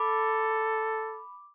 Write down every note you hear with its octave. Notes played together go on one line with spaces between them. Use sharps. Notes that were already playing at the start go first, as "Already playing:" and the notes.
Already playing: A4 B5 D6